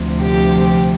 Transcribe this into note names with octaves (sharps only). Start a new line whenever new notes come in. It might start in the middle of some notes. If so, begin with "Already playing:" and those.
Already playing: D2 C3 F3
G4